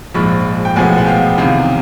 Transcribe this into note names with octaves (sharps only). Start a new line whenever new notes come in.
A#1 G#2 F3 G#3 B5 C#6
G5
B1 A2 F3 G#3 B3 F#5 G#5
F#5
F5 G5
E2 C3 D#3 F5 G5